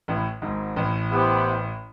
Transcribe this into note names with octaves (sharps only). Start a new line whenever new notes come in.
A1 A2
G#1 G#2
A1 A2
B3 E4 G4 C5